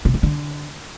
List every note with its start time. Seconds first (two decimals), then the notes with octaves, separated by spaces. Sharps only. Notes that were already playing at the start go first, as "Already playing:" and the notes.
0.05 C3
0.14 C#3
0.23 D3